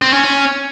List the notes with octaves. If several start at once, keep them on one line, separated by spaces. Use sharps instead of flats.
C4
C#4
C#4